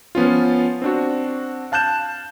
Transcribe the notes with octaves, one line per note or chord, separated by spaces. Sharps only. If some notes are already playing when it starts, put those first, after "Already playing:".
F3 B3 C#4 F4
C4 D4 F#4
F5 A5 F#6 G6 E7